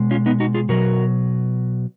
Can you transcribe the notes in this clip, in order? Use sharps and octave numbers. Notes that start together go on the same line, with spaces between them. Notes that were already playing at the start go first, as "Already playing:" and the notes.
Already playing: B2 G#3
C#4 F4
B3 D#4
D#4 F#4
F4 G#4
B2 F#3 F#4 A#4